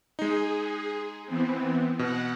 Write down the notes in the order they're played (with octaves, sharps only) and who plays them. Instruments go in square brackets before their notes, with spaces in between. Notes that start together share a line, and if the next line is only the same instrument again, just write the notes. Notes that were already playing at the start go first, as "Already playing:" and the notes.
[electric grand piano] G#3 D#4 [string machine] G#4
[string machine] E3 B3 C4
[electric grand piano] B2 [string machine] F#5